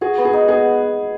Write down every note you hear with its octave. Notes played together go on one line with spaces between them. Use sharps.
F#4 G#4
B3
G#4
D#4
B3 G#4